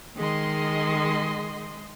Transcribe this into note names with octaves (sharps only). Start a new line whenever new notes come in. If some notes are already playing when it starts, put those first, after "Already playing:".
D#3 G#3 D#5 C6